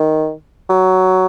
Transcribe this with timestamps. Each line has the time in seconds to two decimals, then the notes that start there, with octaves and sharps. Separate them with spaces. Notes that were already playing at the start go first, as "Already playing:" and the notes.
Already playing: D#3
0.69 F#3